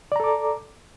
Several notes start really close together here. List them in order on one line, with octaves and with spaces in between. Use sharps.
D5 A#5 A4 D6